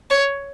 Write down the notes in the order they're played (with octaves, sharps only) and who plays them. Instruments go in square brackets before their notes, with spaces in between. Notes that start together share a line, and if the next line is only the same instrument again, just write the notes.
[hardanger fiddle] C#5